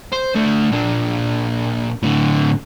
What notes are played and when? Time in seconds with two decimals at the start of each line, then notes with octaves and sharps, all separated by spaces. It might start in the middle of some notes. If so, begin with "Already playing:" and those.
0.12 C5
0.35 A3 D4
0.71 A#2 D4
2.03 A2 D3